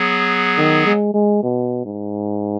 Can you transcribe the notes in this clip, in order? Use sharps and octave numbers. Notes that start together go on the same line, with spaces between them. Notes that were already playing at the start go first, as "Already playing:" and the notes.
Already playing: F#3 B3 G#4
D#3
G#3
G#3
B2
G#2